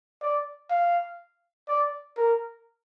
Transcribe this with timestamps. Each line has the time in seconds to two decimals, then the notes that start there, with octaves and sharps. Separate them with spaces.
0.22 D5
0.70 F5
1.68 D5
2.17 A#4